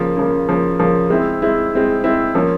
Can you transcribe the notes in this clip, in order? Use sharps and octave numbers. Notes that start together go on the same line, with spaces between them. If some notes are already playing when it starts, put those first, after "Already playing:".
Already playing: C#3 F3 A#3
C#3 F3 A#3
C#3 F3 A#3
C#3 F3 A#3
G#3 C4 E4
G#3 C4 E4
G#3 C4 E4
G#3 C4 E4
F3 A#3 C#4